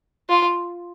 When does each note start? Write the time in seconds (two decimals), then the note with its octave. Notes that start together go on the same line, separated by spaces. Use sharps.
0.29 F4